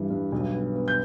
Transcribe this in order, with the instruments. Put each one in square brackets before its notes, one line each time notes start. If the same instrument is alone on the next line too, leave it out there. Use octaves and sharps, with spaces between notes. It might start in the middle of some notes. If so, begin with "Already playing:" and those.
Already playing: [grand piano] G2 E3 G3
G2
B1
B3
B3
G6